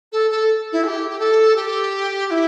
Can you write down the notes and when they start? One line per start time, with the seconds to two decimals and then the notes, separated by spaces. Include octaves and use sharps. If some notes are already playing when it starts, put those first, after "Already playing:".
0.12 A4
0.30 A4
0.72 E4
0.83 A4
0.87 G4
1.09 G4
1.19 A4
1.55 G4
2.26 G4
2.30 E4